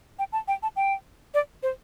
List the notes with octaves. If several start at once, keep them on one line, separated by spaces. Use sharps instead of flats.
G5
A5
G5
A5
G5
D5
C5